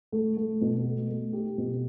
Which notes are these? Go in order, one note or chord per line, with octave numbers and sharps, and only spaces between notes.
A3
A3
B2
A3
A3
G4
B2